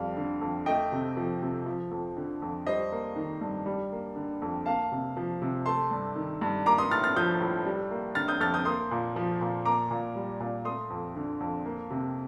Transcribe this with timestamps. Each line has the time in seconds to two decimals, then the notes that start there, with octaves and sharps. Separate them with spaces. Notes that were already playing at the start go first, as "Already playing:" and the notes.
Already playing: F2 G3 F5
0.17 D3
0.41 F2
0.66 A3 D#5 G5
0.92 C3
1.17 F3
1.42 C3
1.66 F3
1.91 F2
2.17 D3
2.42 F2
2.67 G3 C5 D#5
2.92 A#3
3.16 D#3
3.41 G2
3.66 G3
3.92 A#3
4.16 D3
4.42 F2
4.66 A#3 F5 A5
4.92 C3
5.17 F3
5.42 C3
5.66 A3 A5 C6
5.91 G2
6.16 D#3
6.41 G2
6.66 A#3 A#5 D6
6.78 C6 D#6
6.91 A2 F6 A6
7.04 F6 A6
7.16 F3 D#6 G6
7.41 A2
7.66 G3
7.91 A#3
8.15 D3 F6 A6
8.28 D#6 G6
8.40 F2 F6 A6
8.54 D#6 G6
8.65 A#3 C6 D#6
8.91 A#2
9.16 F3
9.41 A#2
9.65 A#3 A#5 D6
9.91 A#2
10.16 G3
10.40 A#2
10.65 A3 C6 D#6
10.90 F2
11.16 D3
11.40 F2
11.65 A#3
11.90 C3